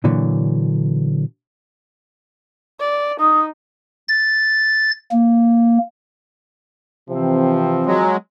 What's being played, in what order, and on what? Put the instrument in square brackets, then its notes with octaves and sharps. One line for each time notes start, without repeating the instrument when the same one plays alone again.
[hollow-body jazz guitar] A#2 D3 E3 F#3
[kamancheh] D5
[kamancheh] D#4 [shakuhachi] D#6
[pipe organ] A6
A#3
[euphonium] C3 [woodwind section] E3 C4 [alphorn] F3
[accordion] F#3 G#3